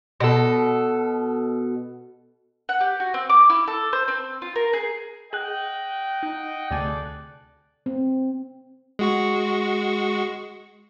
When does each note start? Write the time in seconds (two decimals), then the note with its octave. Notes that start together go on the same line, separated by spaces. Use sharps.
0.20 B2 A4
2.69 F#5
2.81 G4
3.00 F#4
3.14 C4
3.29 D6
3.50 E4
3.67 A4
3.93 C5
4.08 C4
4.42 F4
4.56 A#4
4.73 G#4
5.33 G#4 D#5 F#5 G5 F#6 F#7
6.23 D#4
6.71 D2 C3 G#4 A4 D5 G#5
7.86 C4
8.99 G#3 F#4 C#6